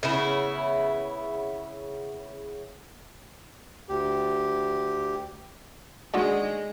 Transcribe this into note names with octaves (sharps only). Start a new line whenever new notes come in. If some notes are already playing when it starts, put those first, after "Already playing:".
C#3 B3 E4
D2 G4
D3 D#3 G#3 F#4